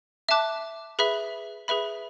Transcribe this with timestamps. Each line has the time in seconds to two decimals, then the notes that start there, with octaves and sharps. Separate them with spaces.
0.29 E5 A5 D6 F#6
0.99 G#4 B4 E5 B5
1.68 G#4 B4 E5 B5